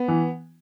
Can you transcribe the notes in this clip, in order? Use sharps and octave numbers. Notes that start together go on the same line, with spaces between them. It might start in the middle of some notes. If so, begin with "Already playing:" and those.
Already playing: B3
E3